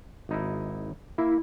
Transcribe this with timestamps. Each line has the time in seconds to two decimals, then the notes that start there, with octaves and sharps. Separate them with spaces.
0.29 G#1 D#4 E4
1.18 A#3 E4